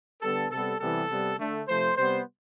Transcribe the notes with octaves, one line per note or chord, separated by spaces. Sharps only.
D3 G3 B3 A4
C3 G3 B3 A4
C3 E3 G3 B3 A4
C3 G3 B3
D3 A3
C3 F3 A3 C5
C3 G3 B3 C5